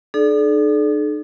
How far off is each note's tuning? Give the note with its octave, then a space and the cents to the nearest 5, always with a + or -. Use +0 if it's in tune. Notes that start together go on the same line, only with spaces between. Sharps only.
D#4 -45 A4 -40 D5 +0